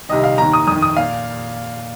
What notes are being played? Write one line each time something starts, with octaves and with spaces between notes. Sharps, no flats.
C2 C3 D#3 D#5
F5
D#2 D#3 A#5
D#6
F2 D#3 D#6
D#6
A#2 F5